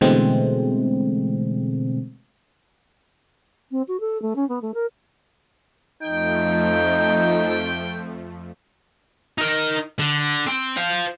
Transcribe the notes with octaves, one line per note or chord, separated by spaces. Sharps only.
B2 D3 E3 G#3 A3 C4
C4
F#4
A4
A3
C#4
B3
A3
A#4
F2 F3 A3 D#4 G5
D#4 A#4
D3
C4 G5
C5 F5